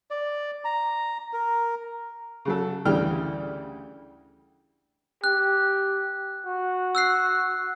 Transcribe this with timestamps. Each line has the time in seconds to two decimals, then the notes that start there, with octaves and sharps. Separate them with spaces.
0.11 D5
0.65 A#5
1.33 A#4
2.45 C#3 F#3 A4
2.85 D2 C#3 E3 G3 G5 F6
5.24 G4 F#6
6.46 F#4
6.95 E6 F#6 C7